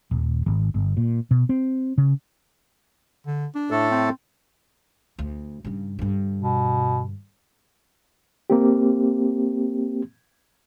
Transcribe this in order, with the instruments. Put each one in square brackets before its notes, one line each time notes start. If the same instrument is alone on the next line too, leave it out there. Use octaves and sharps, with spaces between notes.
[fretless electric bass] D#1
G#1
G1
A#2
B2
C4
C#3
[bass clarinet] D3
D4
[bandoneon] A2 A3 A4
[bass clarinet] C4
[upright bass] D2
G2 C#3
G2 D3
[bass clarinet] B2
[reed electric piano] A#3 C4 G4